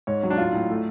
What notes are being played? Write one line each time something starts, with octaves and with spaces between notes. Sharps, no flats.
G#2 C#5
F#3
D4
A2 F4
A2
A3